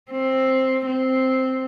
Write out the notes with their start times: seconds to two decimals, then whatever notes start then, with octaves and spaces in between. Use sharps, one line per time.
0.11 C4
0.86 C4